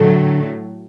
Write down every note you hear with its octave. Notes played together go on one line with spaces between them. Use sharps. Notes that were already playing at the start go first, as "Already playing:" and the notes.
Already playing: A2 D3 F#3 A3